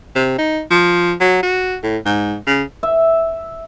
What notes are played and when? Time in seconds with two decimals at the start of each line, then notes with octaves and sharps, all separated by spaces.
0.16 C3
0.38 D#4
0.71 F3
1.21 F#3
1.43 F#4
1.83 A2
2.06 G#2
2.47 C#3
2.83 E5